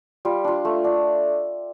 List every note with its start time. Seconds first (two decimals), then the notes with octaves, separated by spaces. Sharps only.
0.25 G3 F4
0.44 D4 F4
0.65 A3
0.84 D4